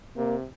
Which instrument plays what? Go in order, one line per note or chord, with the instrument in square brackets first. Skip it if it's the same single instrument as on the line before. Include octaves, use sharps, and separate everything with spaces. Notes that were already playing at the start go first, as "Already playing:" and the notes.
[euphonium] C3 [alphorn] A#3